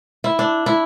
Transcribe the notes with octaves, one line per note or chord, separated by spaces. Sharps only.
E4
D4
E4